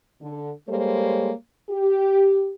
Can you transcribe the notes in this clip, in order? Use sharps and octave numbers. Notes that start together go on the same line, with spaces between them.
D3
G3 G#3 A#3 A4 C5 C#5
G4